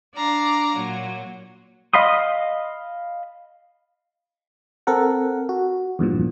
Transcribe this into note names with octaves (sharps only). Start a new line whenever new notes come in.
D4 D5 F5 A#5
A#2 F#3
D#5 F5 B5 C6 D#6
C4 A4 A#4 F#5
F#4
E2 G2 A#2 F3